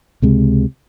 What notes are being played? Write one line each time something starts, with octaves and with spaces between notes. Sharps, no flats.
C#2 C3 G#3